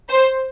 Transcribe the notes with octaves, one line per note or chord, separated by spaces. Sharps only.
C5